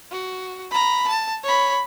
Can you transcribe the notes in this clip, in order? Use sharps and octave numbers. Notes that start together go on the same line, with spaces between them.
F#4
A#5 B5
A5
C#5 B5